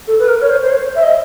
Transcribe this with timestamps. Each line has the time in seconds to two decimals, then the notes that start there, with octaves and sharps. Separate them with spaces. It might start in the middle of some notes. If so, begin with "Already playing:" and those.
0.07 A4
0.19 B4
0.28 A#4
0.41 C#5
0.50 C5
0.62 C5
0.71 C#5
0.95 E5
1.03 D#5